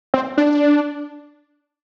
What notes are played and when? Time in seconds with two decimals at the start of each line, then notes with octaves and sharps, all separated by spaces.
0.14 C4
0.37 D4